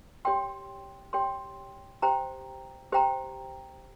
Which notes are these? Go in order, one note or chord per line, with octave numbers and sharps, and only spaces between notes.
G4 C#5 G5 C6
G4 C#5 G5 C6
G4 C5 G5 A#5
G4 C5 G5 A#5